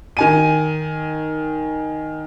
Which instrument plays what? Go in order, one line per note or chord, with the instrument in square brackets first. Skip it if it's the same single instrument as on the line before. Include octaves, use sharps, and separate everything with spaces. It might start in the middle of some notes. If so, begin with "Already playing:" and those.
[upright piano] D#3 G#5 D#7